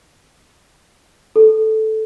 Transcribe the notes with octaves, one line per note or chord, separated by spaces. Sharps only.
A4